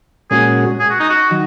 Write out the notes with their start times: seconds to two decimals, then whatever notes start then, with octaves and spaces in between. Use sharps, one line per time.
0.31 A#2 G#3 C#4 F#4 G#4
0.80 G#4
0.90 F#4
1.00 D#4
1.10 F#4
1.31 D#3 F#3